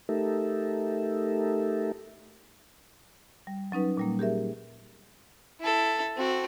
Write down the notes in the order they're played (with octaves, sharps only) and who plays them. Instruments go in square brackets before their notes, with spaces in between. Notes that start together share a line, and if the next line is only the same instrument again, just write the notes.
[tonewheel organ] A3 D#4 G4 A4 A#4 E5
[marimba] G3
F#3 C#4 D#4 B4
A#2 G3 A#3
G4 G#4 A#4 E5
[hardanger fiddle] E4 A4
C4 F#4